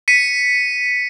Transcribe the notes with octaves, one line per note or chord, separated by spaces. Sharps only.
B6 C#7 D#7